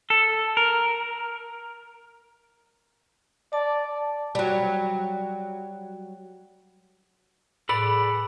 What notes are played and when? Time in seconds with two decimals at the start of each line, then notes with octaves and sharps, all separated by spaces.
0.10 A4
0.57 A#4
3.53 D5 A5
4.35 F#3 G3
7.69 A2 G#4 A4 B4 D5 B5